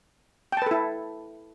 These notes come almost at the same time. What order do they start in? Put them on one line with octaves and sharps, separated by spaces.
G5 A5 B4 A4 E4